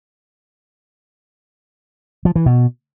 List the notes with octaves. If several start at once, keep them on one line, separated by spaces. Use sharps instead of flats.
F3
E3
B2